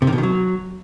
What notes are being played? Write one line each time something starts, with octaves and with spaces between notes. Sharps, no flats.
C3
D#3
B2
D#3
F#3